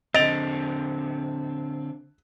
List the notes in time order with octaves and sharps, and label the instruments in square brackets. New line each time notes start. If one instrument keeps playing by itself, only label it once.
[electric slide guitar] D3 C4 [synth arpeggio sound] D#5 [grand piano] A6 D7 F7